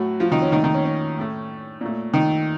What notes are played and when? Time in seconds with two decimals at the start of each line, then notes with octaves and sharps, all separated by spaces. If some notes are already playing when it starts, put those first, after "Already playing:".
Already playing: A2 F#3 A3 F#4
0.20 F3 F4
0.32 D#3 D#4
0.42 C#4
0.52 A#2 D#3 D#4
0.56 A3
0.64 D#3 D#4
0.74 C#4
0.85 C#4
1.18 A2 A3
1.81 A#2 A3
2.14 D#3 D#4